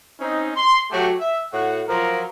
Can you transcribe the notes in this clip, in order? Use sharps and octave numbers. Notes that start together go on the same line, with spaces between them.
C4 C#4 D#4
C6
F#3 A3 F#4 G4
E5
A2 F#4 F#5
F3 F#3 F4 A#4